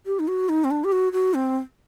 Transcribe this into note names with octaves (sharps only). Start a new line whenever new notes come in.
G4
D#4
F#4
D#4
C4
D4
G4
F#4
F#4
C4